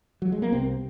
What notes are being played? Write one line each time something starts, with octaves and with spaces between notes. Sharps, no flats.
F#3
G#3
A#3
C2 C3 C4